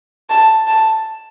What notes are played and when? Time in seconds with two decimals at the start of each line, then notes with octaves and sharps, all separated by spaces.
0.30 A5
0.68 A5